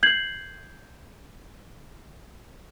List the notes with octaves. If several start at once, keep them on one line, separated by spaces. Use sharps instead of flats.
G6 G#6 C7 F#7